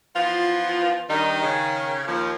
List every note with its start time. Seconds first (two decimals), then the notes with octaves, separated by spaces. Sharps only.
0.15 E3 F3 B3 F4
1.10 G2 D#3 G3 D#4
1.43 C#3
2.07 D#2 F3